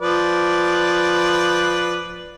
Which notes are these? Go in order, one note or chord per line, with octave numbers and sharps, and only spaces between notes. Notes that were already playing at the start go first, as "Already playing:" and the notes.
F3 B4 D5